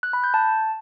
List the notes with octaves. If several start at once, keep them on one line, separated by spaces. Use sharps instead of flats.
F#6
B5
G6
A5